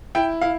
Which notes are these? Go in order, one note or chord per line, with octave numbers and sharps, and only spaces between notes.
E4 G5
E4 F5